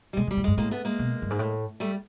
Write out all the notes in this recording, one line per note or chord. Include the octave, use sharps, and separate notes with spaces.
G3
B2 G#3
A#2
G3
A2
G2 G#3
A2 G#3 A#3
A3 B3
G#3 A#3
B2
G2
G#2
A2
G3 A3